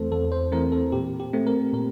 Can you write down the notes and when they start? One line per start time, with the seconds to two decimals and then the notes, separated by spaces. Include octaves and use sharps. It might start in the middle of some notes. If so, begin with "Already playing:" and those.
Already playing: E2 E3 A3 C4 A4 C5
0.12 E2 A4
0.32 C5
0.52 E3 A3 C4 A#4
0.72 A4
0.92 A#2 G4
1.20 G4
1.33 A3 C4
1.47 A#4
1.73 A#2 A#4